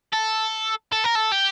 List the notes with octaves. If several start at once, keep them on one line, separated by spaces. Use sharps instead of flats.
A4
A4
A#4
A4
G4